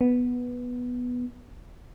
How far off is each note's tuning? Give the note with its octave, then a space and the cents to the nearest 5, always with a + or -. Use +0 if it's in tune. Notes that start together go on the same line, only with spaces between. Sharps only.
B3 -5